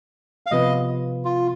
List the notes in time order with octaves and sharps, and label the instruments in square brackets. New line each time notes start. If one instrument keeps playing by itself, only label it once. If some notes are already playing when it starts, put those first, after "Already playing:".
[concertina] F5
[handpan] C3 F3 B3 F4 B4 [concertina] D#5
[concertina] F4